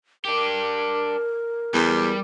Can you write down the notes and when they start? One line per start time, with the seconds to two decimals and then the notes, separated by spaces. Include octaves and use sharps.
0.25 D4 G4 A#4
1.74 E2 G3